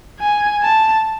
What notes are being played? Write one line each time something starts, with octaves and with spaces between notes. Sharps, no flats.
G#5
A5